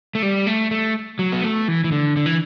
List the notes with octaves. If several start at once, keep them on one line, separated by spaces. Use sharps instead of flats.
A3
G3
A3
A3
F#3
B3
A3
E3
E3
D3
D3
E3